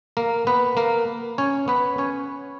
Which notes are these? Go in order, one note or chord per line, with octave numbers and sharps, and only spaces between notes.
A#3 A#4
B3 B4
A#3 A#4
C#4 C#5
B3 B4
C#4 C#5